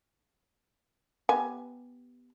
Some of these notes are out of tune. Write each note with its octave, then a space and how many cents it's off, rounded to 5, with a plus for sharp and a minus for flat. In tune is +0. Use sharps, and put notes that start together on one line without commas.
B3 +0 G4 +5 G#5 +5